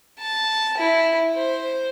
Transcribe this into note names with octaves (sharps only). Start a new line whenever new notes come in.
A5
E4
C5